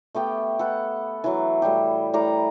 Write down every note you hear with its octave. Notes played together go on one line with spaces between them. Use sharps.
A3 B3 G4 G5
A4 B4 F#5
E3 F#3
A2 G3 E4 G4
A2 G3 A#5 D6